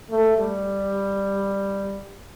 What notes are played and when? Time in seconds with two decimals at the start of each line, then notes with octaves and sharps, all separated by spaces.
0.11 A3
0.38 G3